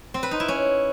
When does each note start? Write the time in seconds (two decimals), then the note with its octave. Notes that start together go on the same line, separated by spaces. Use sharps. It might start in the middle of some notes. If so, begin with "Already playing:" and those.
0.14 C4
0.23 B4
0.31 D#4
0.40 E4
0.48 C#4